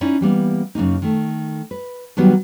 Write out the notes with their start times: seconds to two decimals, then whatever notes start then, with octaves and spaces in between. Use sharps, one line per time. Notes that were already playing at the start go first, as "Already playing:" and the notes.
0.01 C#4 D#4 E4 D5
0.21 E3 G3 A#3 B3
0.75 F#2 C#3 A#3 D#4
1.02 D#3 A3
1.71 B4
2.17 D#3 F#3 G3 B3